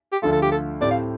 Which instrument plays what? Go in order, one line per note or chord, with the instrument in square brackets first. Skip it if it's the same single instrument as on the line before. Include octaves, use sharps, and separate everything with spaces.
[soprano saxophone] G4
[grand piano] D2 D3 F3 A3 F4 [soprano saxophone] A4
[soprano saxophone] A4
G4
A4
[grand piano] A2 A3 C4 G4 [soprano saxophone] D5
[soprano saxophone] F5